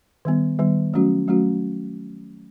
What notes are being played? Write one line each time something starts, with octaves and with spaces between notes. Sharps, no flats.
D#3 G3 B3
D#3 G3 B3
F#3 A3 C#4 F#4
F#3 A3 C#4 F#4